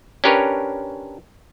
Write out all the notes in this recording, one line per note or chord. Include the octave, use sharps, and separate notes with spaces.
C#4 D4 G4 A#4 B4 C#5